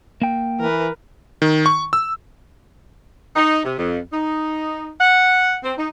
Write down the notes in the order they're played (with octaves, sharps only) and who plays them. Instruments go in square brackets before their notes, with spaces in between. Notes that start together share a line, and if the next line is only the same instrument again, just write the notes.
[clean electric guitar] A#3 G5
[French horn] E3 [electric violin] A#4 B4
[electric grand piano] D#3
C#6
E6
[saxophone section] D#4
C3
F2
D#4
F#5
C4
D#4